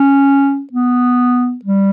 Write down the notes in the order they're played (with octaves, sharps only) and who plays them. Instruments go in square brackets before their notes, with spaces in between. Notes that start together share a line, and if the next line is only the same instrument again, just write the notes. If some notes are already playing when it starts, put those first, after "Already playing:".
Already playing: [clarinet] C#4
B3
G3